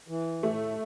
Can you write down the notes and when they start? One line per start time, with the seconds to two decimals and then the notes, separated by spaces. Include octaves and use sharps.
0.08 E3
0.43 A2 A3